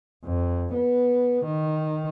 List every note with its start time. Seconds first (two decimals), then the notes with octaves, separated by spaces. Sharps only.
0.25 F2
0.74 B3
1.46 D#3